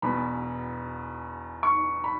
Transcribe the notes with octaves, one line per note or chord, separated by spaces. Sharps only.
E1 E2 B2 B5
C#6
B5